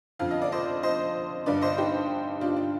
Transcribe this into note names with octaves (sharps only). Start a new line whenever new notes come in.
F2 D3 F5
D#5
D5
C5 D#5
C5 D#5
G2 D3 B4 D5
C5 D#5
D#4 G4
D4 F4
D4